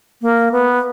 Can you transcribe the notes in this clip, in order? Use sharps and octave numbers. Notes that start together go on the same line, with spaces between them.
A#3
B3